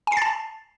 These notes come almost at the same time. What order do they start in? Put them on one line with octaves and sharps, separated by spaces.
G#5 C7 A6 A5